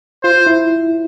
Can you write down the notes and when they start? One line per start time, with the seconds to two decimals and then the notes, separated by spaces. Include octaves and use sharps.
0.23 F4 C5
0.47 E4